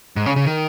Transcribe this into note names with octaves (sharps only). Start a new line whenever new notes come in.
G#2
C#3
C#3
D#3